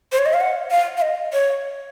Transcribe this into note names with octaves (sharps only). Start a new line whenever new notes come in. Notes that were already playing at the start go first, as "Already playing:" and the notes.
C5
C#5
D#5
F5
F#5
F5
F5
D#5
C#5